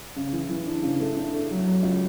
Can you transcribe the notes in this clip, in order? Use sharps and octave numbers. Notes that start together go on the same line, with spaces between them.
C#3
E3
E3
D4
C#3
A3
D4
A3
F#3
F#3
C#2